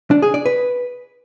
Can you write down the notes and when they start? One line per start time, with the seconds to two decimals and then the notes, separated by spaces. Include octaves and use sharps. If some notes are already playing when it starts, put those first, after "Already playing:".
0.11 D4
0.22 G#4
0.34 D5
0.46 B4